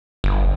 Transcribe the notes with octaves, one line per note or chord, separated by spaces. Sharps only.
G1